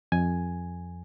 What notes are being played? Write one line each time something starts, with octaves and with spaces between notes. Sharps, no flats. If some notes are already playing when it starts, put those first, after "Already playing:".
F2 G#5